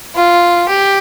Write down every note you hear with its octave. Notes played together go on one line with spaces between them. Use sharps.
F4
G4